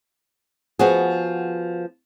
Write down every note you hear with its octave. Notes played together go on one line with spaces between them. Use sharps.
F3 B3 F#4 G#4